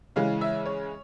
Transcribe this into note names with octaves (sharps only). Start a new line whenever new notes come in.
C#3 E3 G#3 F5
E5
C#5